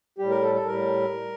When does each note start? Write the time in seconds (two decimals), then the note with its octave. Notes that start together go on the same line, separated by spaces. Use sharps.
0.18 A2 G3 G4
0.30 A#4
0.42 A4
0.55 A4
0.67 A2 G3 A#4